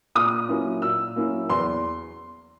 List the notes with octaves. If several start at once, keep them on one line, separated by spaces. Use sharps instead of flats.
A#2 D#6
F#3 A#3 C#4 E4
A#2 E6
F#3 A#3 C#4 E4
E2 C6